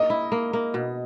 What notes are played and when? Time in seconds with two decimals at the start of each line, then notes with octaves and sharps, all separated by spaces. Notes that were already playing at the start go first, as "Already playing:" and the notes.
Already playing: A#3 D#5
0.10 E4
0.32 A#3
0.53 A#3
0.74 B2